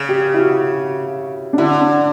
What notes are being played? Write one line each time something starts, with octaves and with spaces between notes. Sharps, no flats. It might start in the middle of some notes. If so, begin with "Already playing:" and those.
Already playing: C#3
G4
E4
F#4
D4
D3 E4
D4